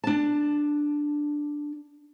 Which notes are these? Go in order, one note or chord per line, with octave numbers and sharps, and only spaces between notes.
D4 A5